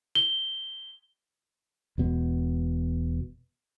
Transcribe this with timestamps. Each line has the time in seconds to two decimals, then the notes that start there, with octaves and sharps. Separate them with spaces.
0.15 G7
1.98 E1 B2